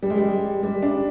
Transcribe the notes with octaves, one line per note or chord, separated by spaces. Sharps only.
G3
G#3
G3
G3
D4